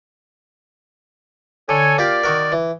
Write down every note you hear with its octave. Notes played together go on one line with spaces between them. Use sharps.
D3 A4 C#5 G#5
A#3 F4 G4 D5
D#3 F#4 A#4
E3